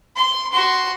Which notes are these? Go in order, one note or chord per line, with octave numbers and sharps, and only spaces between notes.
C6
F#4 C6